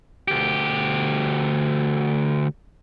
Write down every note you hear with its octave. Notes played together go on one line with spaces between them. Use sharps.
D2 G4